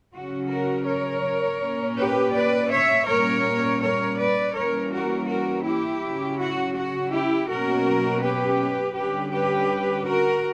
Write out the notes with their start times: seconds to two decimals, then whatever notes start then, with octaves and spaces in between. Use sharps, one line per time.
0.14 C#3 F#3 C#4 F#4
0.50 F#4 A#4
0.87 A#4 C#5
1.61 A#2 A#3 C#4
1.97 G4 B4
2.34 B4 D5
2.71 C#5 E5
3.07 A#2 G3 A#3 C#4 A#4 C#5
3.81 A#4 C#5
4.18 B4 D5
4.54 E3 G3 A#3 C#4 A#4 C#5
4.91 F#4 A#4
5.28 F#4 A#4
5.65 E4 G4
6.02 C#3 F#3 C#4
6.38 F#4
6.75 F#4
7.11 E4 G4
7.49 B2 F#3 A#3 C#4 F#4 A#4
8.22 G4 B4
8.96 D3 G3 C#4 G4 B4
9.33 G4 B4
10.06 F#4 A#4